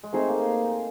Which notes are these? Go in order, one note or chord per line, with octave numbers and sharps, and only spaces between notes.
G#3
A3 C4 D#4 G#4 C5
A#3